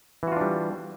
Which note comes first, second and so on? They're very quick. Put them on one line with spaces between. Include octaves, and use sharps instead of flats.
E3 F#4 F4 D4 G3